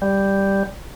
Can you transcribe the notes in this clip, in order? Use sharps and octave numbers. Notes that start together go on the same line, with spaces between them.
G3